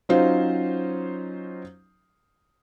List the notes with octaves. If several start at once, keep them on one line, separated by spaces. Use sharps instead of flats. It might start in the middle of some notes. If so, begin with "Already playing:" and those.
F#3 C#4 D#4 F4 C5